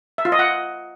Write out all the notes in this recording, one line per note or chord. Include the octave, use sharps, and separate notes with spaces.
E5
F4
D#5
F#5